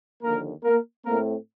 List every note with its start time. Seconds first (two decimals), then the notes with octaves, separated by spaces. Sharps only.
0.23 D#2 D3 F3 A#3 A#4
0.64 A#3 A#4
1.06 A2 A3 A#3 C4 A#4